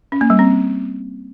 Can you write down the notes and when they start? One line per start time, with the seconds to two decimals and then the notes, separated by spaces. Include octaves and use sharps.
0.12 C#4
0.21 A#3
0.30 G3
0.39 C4